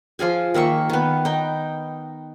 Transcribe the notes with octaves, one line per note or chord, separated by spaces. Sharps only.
F3 F4 G#4 G#5
D#3 A#3 E5 C#6
D#3 B3
D#4 G5